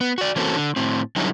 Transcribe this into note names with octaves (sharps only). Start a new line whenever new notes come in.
B3
F#4 D5
E3 A#3 C4 C#4 F#4 A4
D3
A2 C4
D3 F#3 G3 C#4 D#4 E4